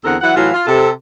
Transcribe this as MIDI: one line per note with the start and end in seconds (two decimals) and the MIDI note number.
0.04 0.15 40
0.04 0.15 50
0.04 0.15 60
0.04 0.15 69
0.04 0.15 70
0.04 0.15 78
0.21 0.33 52
0.21 0.33 54
0.21 0.33 64
0.21 0.33 78
0.36 0.50 45
0.36 0.50 52
0.36 0.50 54
0.36 0.50 65
0.36 0.50 66
0.36 0.50 77
0.54 0.62 65
0.67 0.88 48
0.67 0.88 69